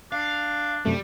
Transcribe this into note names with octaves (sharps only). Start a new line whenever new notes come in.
D4 F5
F#2 C3 G3 A3